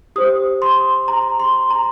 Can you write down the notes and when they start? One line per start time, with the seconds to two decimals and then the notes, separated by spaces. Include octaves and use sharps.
0.16 G4 C5 D#6
0.62 C6
1.08 A#5
1.40 C6
1.70 A#5